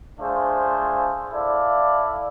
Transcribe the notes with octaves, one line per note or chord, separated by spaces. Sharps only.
A3 D4 F4 G#4 C5
E4 A4 D5 F5